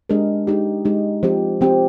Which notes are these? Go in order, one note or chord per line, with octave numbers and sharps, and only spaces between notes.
G#3 D4 G4 A#4
G#3 D#4 G4
G#3 D#4 G4
F3 C4 G4
F3 C4 G4